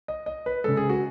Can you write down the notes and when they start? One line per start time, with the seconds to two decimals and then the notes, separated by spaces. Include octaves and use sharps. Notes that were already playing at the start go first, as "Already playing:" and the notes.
0.08 D#5
0.26 D#5
0.46 B4
0.64 C#3 G#3 A4
0.77 G#4
0.89 F#4